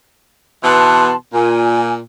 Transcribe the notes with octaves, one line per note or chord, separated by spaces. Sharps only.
B2 E3 B3 A5 C6
A#2 G#5